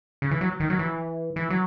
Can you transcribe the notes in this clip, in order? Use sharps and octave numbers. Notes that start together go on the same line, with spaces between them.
C#3
E3
F#3
D#3
F#3
E3
E3
F#3